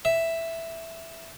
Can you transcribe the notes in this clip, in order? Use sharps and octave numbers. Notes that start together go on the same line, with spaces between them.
E5